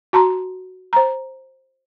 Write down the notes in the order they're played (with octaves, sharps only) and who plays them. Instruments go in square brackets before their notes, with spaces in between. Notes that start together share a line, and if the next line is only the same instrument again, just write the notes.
[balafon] F#4 A5 A#5 C6
C5 A#5